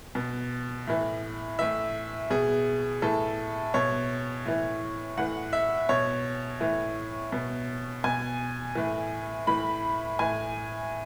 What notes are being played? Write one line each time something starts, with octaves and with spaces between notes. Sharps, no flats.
B2
A2 E3
A2 E3 E5
B2 G#4
A2 E3 A4
B2 C#5
A2 E3
A2 E3 F#5
E5
B2 C#5
A2 E3
B2
B2 G#5
A2 E3
A2 E3 B5
A2 E3 G#5